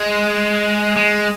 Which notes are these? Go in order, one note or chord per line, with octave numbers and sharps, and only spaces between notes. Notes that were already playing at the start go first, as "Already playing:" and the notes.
Already playing: G#3
G#3